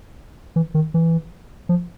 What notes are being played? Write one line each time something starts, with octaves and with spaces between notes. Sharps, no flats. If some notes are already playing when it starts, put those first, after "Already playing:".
E3
D#3
E3
F3